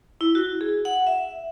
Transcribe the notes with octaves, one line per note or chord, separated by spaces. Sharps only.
E4
F#4
G#4
F#5
E5